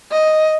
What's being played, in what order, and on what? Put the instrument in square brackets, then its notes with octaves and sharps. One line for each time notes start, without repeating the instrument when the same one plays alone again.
[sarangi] D#5